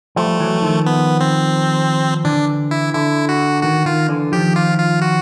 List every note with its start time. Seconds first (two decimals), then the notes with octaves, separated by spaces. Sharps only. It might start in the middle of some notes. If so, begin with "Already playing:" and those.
0.16 F3 G3 A3
0.40 E3 F#3
0.62 D#3 F3
0.86 B3
1.20 C4
2.24 D3 E3 D4
2.71 E4
2.94 D3 E4
3.29 F#4
3.63 D#3 F#4
3.86 D#3 F4
4.09 D3 E3
4.32 D#3 F3 G4
4.56 F4
4.78 F4
5.02 F#4